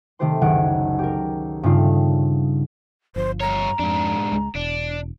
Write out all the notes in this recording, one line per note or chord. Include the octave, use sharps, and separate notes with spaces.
C3 D#3 A3 G4 C5 C6
F#1 C#2 D#3 F#5 D7
G4 A#4
G2 C#3 A3 C4 D#4 F4
G1 F3 C5
G2 C#5 A#5
F2 G#2 D4
C#2 G#3
E1 D4